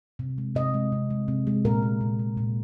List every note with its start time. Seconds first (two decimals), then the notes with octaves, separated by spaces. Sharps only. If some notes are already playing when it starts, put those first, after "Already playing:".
0.19 C3
0.38 G#3
0.55 C3 D#5
0.74 G#3
0.92 C3
1.10 G#3
1.28 C3
1.47 G#3
1.65 A#2 A#4
1.82 A#3
2.01 A#2
2.19 A#3
2.37 A#2